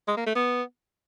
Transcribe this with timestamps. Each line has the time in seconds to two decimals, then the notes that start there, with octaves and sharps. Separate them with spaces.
0.08 G#3
0.17 A#3
0.26 A3
0.35 B3